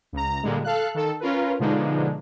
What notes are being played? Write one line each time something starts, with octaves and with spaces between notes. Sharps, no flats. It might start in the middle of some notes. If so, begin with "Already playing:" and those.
C#2 A#5
A#2 D3 G3 G#3
A4 F5 F#6
D#3 A4
C#4 F4 A#4 B4
B2 D3 F3 G#3 D4 D#4